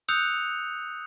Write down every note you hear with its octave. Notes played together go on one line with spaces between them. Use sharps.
D#6 E6 F#6 G6 C#7 F7